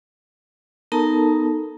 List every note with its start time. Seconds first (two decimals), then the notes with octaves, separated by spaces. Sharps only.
0.92 B3 D#4 A4 A#4 A5 A#5